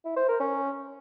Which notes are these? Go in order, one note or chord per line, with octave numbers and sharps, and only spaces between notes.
E4
C5
A#4
C#4